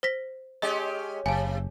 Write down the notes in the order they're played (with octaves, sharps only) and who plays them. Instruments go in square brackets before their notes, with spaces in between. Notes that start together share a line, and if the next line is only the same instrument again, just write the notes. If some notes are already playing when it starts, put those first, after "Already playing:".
[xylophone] C5 A#6 B6
[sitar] G#3 C#4 G4 [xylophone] D#5
[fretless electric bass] F#1 [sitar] C3 [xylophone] G#5 A5